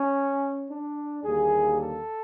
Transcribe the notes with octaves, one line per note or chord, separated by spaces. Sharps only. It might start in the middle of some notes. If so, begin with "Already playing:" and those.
Already playing: C#4
D4
D#2 D3 G3 A#3 G#4
A4